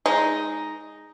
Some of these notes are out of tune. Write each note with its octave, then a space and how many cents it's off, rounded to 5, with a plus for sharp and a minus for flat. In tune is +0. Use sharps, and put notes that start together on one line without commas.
G#3 +0 D#4 +0